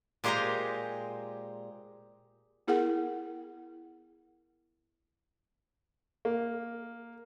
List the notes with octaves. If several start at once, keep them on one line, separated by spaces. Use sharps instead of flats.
A#2 G#3 G4 C5 G#5 A#5
B3 E4 G#4 A#4 F#5 G5
A#3